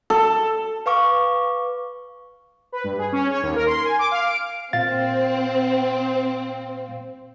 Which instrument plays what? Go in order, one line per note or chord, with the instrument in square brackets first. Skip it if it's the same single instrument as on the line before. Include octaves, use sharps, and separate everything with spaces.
[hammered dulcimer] A4
[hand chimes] B4 F5 C#6 D6
[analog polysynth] B4
G2
G#4
C#4
C#5
D#2
A#4
C6
G#5
D6
F5
D7
[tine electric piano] A#2 F5 A6 [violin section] C4